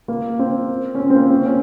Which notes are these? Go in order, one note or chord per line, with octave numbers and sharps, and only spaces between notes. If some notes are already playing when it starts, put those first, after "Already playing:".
A#3
C4
C#4
C4
C4
A#3
C4
C#4